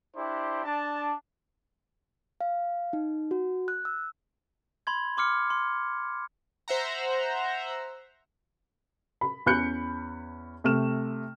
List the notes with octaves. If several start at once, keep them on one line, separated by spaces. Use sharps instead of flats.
D4 E4 G4 C5
D4 A5
F5
D#4
F#4
F#6
E6
B5 C6 G#6
C6 D6 F6 C#7
C6
C5 E5 F#5 A#5
B5
E2 C#4 B5 F#6 G6 C#7
C3 A3 F6 E7